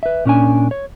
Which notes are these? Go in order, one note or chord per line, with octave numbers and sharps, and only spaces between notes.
B4 E5
A#2 C#4 D4 G#5
C#5